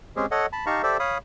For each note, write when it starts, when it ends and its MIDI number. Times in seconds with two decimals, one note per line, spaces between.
0.16 0.26 56
0.16 0.26 60
0.16 0.26 61
0.16 0.26 67
0.16 0.26 68
0.31 0.46 69
0.31 0.46 73
0.31 0.46 75
0.31 0.46 78
0.53 0.66 81
0.53 0.66 83
0.66 0.82 63
0.66 0.82 67
0.66 0.82 77
0.66 0.82 81
0.66 0.82 82
0.66 0.82 85
0.83 0.97 67
0.83 0.97 69
0.83 0.97 72
0.83 0.97 74
0.83 0.97 76
1.00 1.18 73
1.00 1.18 77
1.00 1.18 83
1.00 1.18 87